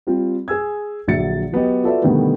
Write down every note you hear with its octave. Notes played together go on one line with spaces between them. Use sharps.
G3 C4 F4
G#4 G#5 E6 G#6
A#1 D3 F#3 E5 A6 C#7
F#3 B3 G4 D#5
F4 F#4 A4 B4 D5 E5
B2 D3 D#3 G3 A3 B3